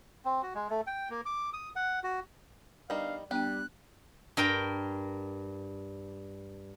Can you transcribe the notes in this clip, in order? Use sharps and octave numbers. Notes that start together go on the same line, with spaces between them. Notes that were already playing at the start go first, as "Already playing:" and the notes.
C4
F#4
G#3
A3
G5
A#3
D6
D#6
F#5
F#4
G3 B3 D4 D#4 A#4 F5
G3 B3 D4 G4 G5 F#6
G2 A#4 G5 A#5